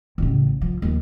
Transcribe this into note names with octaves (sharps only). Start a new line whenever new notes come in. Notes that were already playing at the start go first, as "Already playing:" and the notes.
A1 C#3
F3
D#2